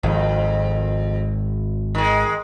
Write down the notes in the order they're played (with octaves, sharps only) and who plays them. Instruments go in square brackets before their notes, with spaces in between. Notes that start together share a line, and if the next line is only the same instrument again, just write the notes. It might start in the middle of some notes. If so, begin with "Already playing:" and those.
[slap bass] G#1 [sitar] F2
[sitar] D#3 G#3